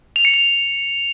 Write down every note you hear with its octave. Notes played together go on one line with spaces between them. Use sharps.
F7
C#7
F7